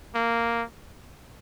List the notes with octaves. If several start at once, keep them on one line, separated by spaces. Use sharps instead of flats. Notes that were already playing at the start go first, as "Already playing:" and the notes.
A#3